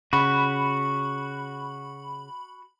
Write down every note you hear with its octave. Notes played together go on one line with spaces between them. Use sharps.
C#3 F#4 B5